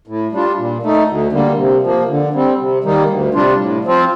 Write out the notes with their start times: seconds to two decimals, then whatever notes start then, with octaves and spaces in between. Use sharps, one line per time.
0.07 A2
0.32 G3 D4 F4
0.58 A#2
0.83 A3 D#4
1.07 D2
1.33 D3 G3 A#3
1.58 C3
1.83 F3 A#3
2.09 D3
2.33 G3 C4
2.58 C3
2.84 D#3 G3 A#3 D#4
3.09 D2
3.34 C3 G3 D4 F4
3.58 A2
3.84 F3 C4 F4